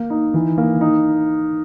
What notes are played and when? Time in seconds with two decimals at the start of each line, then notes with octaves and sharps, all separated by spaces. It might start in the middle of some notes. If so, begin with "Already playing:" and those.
Already playing: A#3
0.10 D#4
0.34 E3
0.58 A#3
0.81 D#4